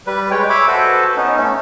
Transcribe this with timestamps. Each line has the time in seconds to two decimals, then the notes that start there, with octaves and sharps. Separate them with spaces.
0.07 G3 B4
0.31 G#3 C#5 G5
0.49 C#5 E5 B5 D6
0.67 F#4 A4 B4 C5
1.16 B3 C#4 D#4
1.38 A3 C#4